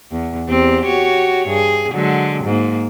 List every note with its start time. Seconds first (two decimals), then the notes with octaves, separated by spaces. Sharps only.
0.12 E2
0.48 E2 C4 G4
0.85 F#4 G4 C#5
1.49 G2 G#4
1.92 D3 F#3 G#3
2.45 G#2 A#3